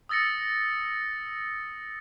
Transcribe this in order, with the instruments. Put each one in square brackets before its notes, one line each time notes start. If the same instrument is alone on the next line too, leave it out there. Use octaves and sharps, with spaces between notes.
[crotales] D#6 E6 A6 A#6 C#7